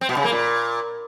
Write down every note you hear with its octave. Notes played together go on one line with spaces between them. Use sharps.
C4
B2
C#3
A#3
A#2